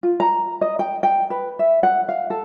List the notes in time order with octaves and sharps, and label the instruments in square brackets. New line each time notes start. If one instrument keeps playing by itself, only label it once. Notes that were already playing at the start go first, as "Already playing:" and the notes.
[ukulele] F4
A#5
D#5
G5
G5
B4
E5
F#5
F5
A4